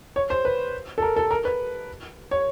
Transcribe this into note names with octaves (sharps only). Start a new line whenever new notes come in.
C#5
C5
B4
A4
A#4
A4
A#4
B4
C#5